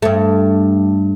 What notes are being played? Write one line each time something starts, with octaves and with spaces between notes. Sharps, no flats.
G2 A3